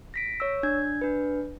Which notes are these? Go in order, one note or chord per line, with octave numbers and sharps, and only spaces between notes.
A#6 B6 D7
C#5 E6
D4 G#6
D4 B4